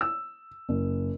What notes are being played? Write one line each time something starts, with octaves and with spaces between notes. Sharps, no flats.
E6
F#1